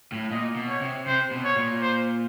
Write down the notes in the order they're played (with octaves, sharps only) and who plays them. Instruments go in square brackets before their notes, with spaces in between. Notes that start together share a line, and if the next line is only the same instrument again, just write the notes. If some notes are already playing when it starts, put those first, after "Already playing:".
[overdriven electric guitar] A2
[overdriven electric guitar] A#2 [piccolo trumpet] D#5
[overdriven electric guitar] B2
[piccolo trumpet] C#5
[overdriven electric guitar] C3
[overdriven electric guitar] C3 [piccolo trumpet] C5
[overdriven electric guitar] B2
[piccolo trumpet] C#5
[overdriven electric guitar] A#2
[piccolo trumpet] C5